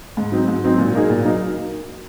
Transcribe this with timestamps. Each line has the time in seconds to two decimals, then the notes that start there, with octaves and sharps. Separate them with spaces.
0.17 G#2
0.32 F#3 C4 D#4
0.48 G#2
0.64 F#3 C4 D#4
0.78 A#2
0.94 F#3 A#3 D#4 G#4
1.10 A#2
1.25 F#3 A#3 D#4